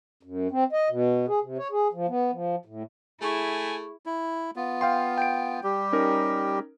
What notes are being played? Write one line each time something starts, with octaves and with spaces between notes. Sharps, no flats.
F#2
C4
D#5
B2
G#4
C3
C#5
G#4
F3
B3
F3
A2
A3 E4 G#4 G#5 C#6
E4
B3 F4
F5 G5 C6
G5 D7
G3 G4
C#4 D#4 A#4